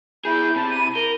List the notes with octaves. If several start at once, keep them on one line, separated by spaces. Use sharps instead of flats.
E4 G#4 B5 G6
C3 A5
D#7
A#4 G7